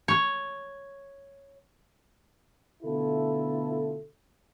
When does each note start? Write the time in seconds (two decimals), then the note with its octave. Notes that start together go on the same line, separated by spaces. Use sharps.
0.08 C#5
2.83 B2 D3 A3 E4 F4 A4